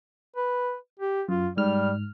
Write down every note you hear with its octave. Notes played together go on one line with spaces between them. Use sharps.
B4
G4
F#2 F4
G#2 G3 F6